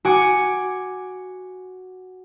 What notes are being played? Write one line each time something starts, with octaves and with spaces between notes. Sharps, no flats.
F#4 G#5 D6 C#7